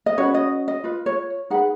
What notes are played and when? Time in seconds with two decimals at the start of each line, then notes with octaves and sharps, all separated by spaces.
0.06 D#5
0.17 C#4 F#4 B4 C#5
0.34 D#5
0.68 D#5
0.84 F4 B4
1.06 C#5
1.50 D#4 G#4 B4 F#5